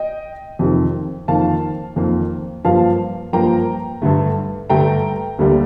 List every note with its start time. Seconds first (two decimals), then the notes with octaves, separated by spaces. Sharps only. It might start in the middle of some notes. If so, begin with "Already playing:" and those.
Already playing: D#5 G5
0.59 F2 C3 D#3
1.28 F2 D#3 A#3 F5 A5
1.96 F2 D#3 A#3
2.65 G2 F3 A#3 F5 A5
3.33 G2 F3 A#3 G5 A#5
4.02 G2 D3 A3
4.70 G2 D3 A3 G5 A#5
5.39 D2 D3 G3 A#3